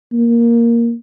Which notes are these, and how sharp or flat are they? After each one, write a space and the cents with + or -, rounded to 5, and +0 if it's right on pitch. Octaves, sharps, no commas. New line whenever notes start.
A#3 +5